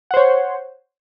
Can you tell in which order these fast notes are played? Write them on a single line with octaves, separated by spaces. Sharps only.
F#5 C5 C#5